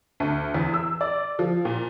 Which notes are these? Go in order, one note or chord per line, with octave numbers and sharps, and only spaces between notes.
D2
E2
E6
D5
F3
A#2